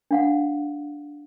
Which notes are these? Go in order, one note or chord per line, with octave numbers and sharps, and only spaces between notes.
D4 F5 F#5